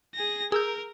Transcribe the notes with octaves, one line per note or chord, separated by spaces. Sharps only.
G#4 A#6
G#4 A#4 E6 G6